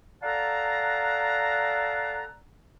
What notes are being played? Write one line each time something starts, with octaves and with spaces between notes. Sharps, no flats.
A4 D5 F5 F#5 A5 A#5